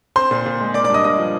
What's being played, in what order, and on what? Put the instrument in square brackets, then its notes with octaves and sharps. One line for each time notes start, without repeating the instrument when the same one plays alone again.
[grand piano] C4 C5 C6
A#2
A#2
G#3
A#3 D5 D6
D5 D6
G2 D#5 D#6
G2 D#5 D#6
F3